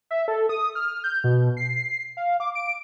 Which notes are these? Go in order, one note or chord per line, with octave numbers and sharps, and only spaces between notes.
E5
A4
D#6
F6
G6
B2
C7
F5
D6
D7